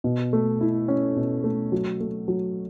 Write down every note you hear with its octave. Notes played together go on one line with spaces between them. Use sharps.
B2
A3
E4
C#4
B2
A3
F#3
A3
F#3